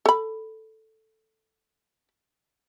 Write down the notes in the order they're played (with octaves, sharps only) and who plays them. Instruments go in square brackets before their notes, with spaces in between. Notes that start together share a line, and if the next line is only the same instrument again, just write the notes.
[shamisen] A4 B5